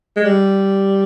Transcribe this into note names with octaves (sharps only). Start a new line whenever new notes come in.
G#3
G3